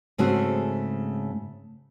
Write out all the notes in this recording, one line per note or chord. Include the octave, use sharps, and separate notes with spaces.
G#2 C#3 A3 C4 F#4